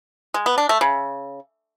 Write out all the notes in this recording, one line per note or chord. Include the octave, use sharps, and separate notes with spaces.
G#3
B3
D4
A3
C#3